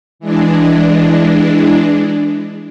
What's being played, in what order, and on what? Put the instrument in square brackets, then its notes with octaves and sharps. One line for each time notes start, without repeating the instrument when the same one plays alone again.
[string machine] E3 G#3 D4